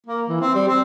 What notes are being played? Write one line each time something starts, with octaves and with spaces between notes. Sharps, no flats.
A#3
E3
C4
G3
C4